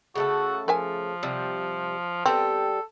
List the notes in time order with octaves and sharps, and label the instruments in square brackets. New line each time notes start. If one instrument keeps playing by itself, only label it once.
[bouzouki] C#3 A3 A4 [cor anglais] F#4
[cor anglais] F3 [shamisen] A#4 E5 G#5
[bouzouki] C3 G3
[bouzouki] G3 G4 [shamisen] B3 C4 [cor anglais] A4